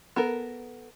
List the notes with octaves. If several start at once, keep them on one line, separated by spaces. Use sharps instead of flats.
B3 A4 A#4